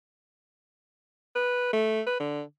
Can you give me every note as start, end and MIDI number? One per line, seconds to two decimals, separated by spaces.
1.35 1.68 71
1.73 2.01 57
2.06 2.17 71
2.20 2.42 50